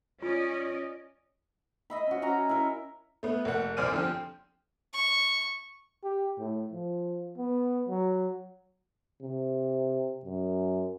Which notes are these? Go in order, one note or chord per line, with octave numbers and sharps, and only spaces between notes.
C#4 F4 D5 D#5
D#5 E5 B5
C#4 F#4
C#4 F#4 A#5
E4 A#4
A3 B3
F1 A#3 F#5
C2 C5 D5 G#5 F6 D#7
D3 F3 C4
C#6
G4
A2
F3
B3
F#3
C3
F#2